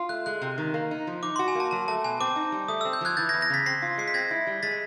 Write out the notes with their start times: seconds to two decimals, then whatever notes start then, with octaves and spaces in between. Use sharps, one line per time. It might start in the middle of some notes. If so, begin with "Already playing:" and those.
Already playing: F4
0.09 A3 F#6
0.26 G#3 F#6
0.42 C3
0.58 D#3
0.74 A#3
0.91 D#4
1.07 F3
1.22 D#4 D6
1.36 F#4 C6
1.48 G#5
1.55 A#3 A5
1.71 F#3 A5
1.88 A3 A5
2.04 B2 G#5
2.20 C4 D6
2.36 D#4
2.52 G3
2.68 A3 D#6
2.81 E6
2.85 C4
2.93 G6
3.01 F3 F#6 G#6
3.17 E3 G6 A6
3.29 G#6 A#6
3.34 E2
3.41 G#6 A#6
3.50 C#3 A6 B6
3.66 C4 A#6 C7
3.82 F4
3.98 G#3 C7
4.08 B6
4.14 C4 G#6 A#6
4.31 E4
4.47 G3
4.63 G#3 A6 B6